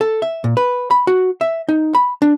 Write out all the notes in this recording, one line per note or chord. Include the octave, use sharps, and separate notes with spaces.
A4
E5
A#2
B4
B5
F#4
E5
D#4
B5
D4